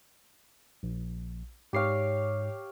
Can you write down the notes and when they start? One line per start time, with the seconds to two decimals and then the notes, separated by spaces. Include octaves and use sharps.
0.83 A#1
1.73 G#2 G4 C#5 F5 C7